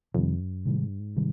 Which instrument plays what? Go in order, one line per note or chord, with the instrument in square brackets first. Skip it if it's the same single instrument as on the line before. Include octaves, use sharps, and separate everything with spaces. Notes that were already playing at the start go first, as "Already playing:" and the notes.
[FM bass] F2 [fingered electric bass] C3 D#3 G3
[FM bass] F#2
[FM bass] A2 [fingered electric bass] C3 D#3 G3
[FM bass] G#2
G2
G#2
[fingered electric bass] C3 D#3 G3